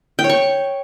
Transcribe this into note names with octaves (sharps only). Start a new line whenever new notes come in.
G5
C#5
C#6